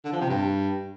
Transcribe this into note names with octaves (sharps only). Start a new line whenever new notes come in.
D3
F3
C3
G2